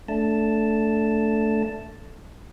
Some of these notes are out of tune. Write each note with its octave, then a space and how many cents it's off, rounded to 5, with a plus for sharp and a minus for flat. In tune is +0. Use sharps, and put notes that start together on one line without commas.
A3 +0 D4 -20 A5 +0